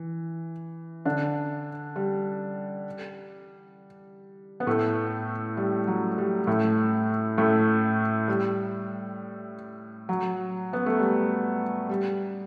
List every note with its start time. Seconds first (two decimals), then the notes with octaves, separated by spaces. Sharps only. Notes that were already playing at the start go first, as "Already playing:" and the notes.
Already playing: E3
1.05 D3 D4
1.96 G3
4.60 B3
4.67 A2 A3
5.57 G3
5.87 F#3
6.18 G3
6.47 A2 A3
7.38 A2 A3
8.28 G3
10.09 F#3
10.73 B3
10.86 A3
10.99 G3
11.89 G3